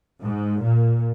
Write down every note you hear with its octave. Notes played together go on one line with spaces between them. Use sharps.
G#2
A#2